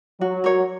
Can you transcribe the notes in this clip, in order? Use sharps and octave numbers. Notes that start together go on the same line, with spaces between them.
F#3 F#4
A#4 C#5